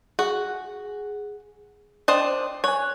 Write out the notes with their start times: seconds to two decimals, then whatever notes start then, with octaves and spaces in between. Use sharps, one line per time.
0.19 F#4 G#4
2.08 D4 C5 D#5 G5
2.64 C#5 G#5 F#6